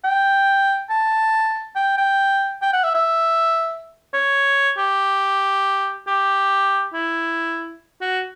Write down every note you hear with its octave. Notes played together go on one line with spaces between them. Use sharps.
G5
A5
G5
G5
G5
F#5
E5
E5
C#5
G4
G4
E4
F#4